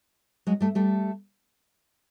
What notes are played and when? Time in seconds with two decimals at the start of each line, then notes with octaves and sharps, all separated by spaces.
0.47 F#3 G#3
0.60 G3 A3
0.75 G3 A3